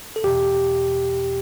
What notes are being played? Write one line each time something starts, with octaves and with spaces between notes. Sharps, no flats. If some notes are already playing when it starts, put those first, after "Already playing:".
A4
E2 B2 G4